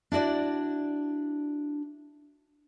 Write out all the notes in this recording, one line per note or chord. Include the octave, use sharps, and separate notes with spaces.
D4 E4 F#4 D5